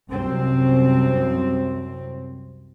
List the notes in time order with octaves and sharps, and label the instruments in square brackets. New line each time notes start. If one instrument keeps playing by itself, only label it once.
[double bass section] C2 F#2 C4